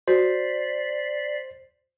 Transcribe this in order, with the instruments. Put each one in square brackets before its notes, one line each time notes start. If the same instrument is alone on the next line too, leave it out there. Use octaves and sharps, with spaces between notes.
[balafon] F#4 [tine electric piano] C5 [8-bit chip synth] D5 B6 C7